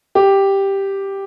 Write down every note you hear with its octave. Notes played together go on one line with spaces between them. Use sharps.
G4